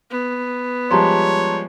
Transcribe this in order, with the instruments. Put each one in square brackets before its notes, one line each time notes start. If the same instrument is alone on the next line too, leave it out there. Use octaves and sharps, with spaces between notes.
[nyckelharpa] B3
[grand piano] F3 G3 G#3 [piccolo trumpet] C#5 [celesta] A5 A#5 C6